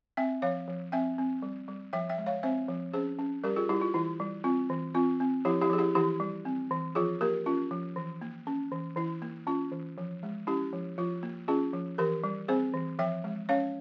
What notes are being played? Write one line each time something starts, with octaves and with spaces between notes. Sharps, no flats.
C4 E5 G5
F3 C#5 F5
F3
C4 E5 G5
C4
G3
G3
F3 E5 G5
E5 G5
G#3
C#5 F5
C4 C5 E5
F3
C#4 G#4 C5
C#4
G3 G4 A#4
F4 G#4
G3 E4 G4
F4
E3 E4
G3
C4 F4
E3
C4 F4
C4
F3 E4 G4
E4 G4
F3 G#4
E4 G4
E3 E4 G4
G3
C4
E3
F3 F4 G#4
A#3 G4 A#4
C#4 F4
F3
E3
A#3
C#4
E3
E3 E4
A#3
C#4 F4
E3
F3
G#3
C#4 E4 G4
F3
F3 F4
A#3
C#4 F4 G#4
F3
E3 G4 A#4
G3
C4 G#4 C5
E3
F3 E5 G5
G#3
C#4 C#5 F5